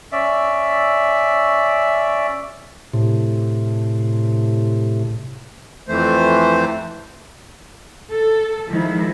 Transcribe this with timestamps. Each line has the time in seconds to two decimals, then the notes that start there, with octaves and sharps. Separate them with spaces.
0.12 C#4 D5 E5
2.93 A2 C3
5.88 F2 E3 A3 C5
8.11 A4
8.69 D#3 F3 G#3 E4